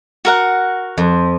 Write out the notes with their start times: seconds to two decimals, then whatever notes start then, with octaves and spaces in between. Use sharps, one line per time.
0.25 F#4 A#4 F#5
0.98 F2